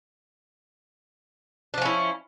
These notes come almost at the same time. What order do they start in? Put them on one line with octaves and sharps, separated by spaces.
D4 F3 C#4 E4